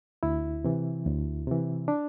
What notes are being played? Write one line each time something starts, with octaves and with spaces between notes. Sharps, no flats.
D2 E4
C3 E3
D2
C3 E3
D4